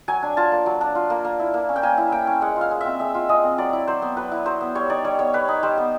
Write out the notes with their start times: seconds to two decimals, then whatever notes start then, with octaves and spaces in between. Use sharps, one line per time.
0.08 F#3 G#5
0.22 D4
0.37 F4 A5
0.52 A#3
0.66 F#3
0.81 D4
0.95 F4
1.10 A#3
1.24 A#3
1.40 E4
1.54 A#3
1.69 C#4
1.76 G5
1.83 A#3 G#5
1.98 E4
2.12 A#3 G5
2.27 C#4
2.42 G#3 F#5
2.56 F4 F5
2.71 G#3
2.81 C4 E5
3.00 G#3 E5
3.14 F4
3.29 G#3 D#5
3.44 C4
3.58 F#3 D5
3.73 E4
3.87 F#3 C5
4.02 B3
4.17 F#3 B4
4.32 E4
4.46 F#3 C5
4.61 B3
4.75 G3 C#5
4.90 D#4 D5
5.04 G3 C#5
5.19 B3 C#5
5.34 G3 B4
5.48 D#4
5.63 G3 C5
5.78 B3